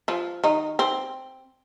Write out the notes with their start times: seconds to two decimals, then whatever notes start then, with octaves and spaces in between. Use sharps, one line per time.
0.08 F3 F4
0.44 D#3 D#4
0.79 C4